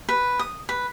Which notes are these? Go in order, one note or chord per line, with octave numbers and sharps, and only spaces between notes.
B4
D#6
B4